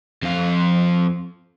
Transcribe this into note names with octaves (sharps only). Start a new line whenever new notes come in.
F2 F4